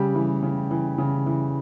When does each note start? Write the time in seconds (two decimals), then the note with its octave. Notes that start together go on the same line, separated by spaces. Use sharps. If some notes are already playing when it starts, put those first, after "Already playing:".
Already playing: C#3 G3 G4
0.15 E3
0.42 C#3
0.71 E3
0.98 C#3
1.26 E3